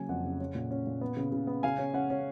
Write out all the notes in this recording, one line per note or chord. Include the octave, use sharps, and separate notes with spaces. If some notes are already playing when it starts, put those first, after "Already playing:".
Already playing: C#3 F#3 A#3 G#5
F2 F#5
C#3
C#4
A#2
C#4
A#2
B3
C#3
C#3
B3
C#3 F5 G#5
C#4
C#4 F#5
C#4